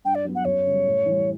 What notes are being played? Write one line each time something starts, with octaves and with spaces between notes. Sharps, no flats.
G2 G5
D5
F#3 B3
F#5
F#2 C#5
C#3 G3
A2
E3 G3